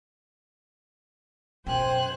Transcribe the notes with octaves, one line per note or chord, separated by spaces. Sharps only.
F#2 B2 C5 G5 G#5 F#6